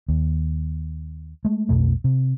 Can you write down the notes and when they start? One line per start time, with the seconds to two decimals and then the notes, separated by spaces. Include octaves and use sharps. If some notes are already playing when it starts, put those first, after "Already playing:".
0.08 D#2
1.45 G#3 A3
1.69 B1 F2 B2 A3
2.04 C3